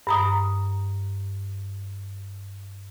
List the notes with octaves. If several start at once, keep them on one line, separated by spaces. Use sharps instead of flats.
G2 A#5 D#6